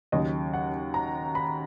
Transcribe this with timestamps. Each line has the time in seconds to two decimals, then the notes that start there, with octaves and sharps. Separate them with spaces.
0.12 D#2 C#3 F#3 D#5
0.54 F#5
0.94 A#5
1.35 B5